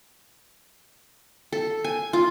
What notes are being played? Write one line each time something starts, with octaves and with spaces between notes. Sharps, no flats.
A4
G#5
F4